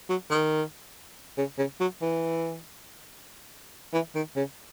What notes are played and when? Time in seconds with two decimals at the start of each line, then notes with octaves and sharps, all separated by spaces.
0.09 F#3
0.30 D#3
1.38 C#3
1.58 C#3
1.80 F#3
2.02 E3
3.94 E3
4.15 D#3
4.36 C#3